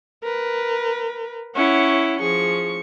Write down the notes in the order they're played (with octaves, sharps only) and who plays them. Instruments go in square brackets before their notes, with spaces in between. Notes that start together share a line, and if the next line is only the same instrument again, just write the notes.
[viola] A#4 B4
[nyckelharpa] C#4 E4 [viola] C#5 F#5
[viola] F3 C#6 [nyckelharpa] G#4